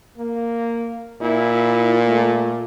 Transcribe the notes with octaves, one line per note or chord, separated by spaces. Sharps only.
A#3
A#2 E4
A3